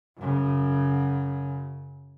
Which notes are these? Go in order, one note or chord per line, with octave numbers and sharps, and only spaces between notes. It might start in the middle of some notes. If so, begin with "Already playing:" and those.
F#2 C#3